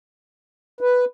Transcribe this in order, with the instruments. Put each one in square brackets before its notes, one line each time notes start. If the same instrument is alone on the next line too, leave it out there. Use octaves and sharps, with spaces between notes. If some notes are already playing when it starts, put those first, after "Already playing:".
[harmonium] B4